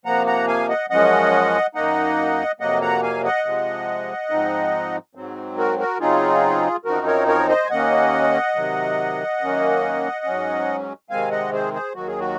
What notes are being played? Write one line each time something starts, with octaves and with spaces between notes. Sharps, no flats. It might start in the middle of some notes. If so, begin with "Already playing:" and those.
C3 F3 A#3 F#5 A#5
F#5 A#5
F5 G#5
D#5 F#5
F#2 F3 G#3 C#4 D#5 F#5
F#2 D#3 A#3 D#4 D#5 F#5
F2 C3 F#3 A#3 D#5 F#5
F#5 A#5
F5 G#5
D#5 F#5
C3 F3 G#3
G#2 F3 C4 D#4
G#2 F#3 C4
F#4 A#4
F#4 A#4
C#3 F#3 C4 D#4 F4 G#4
F#2 F3 C4 D#4 F#4 A#4
A#4 C#5
A#4 C#5
C5 D#5
G#5
D#2 D#3 A#3 C#4 D#5 F#5
C3 D#3 F#3
F#2 D#3 A#3 C#4
G#2 F#3 C#4
C3 D#3 G#3 C4 F5 G#5
D#5 F#5
G#4 C5
G#4 C5
D#2 D#3 F#3 F#4
G#4
F#4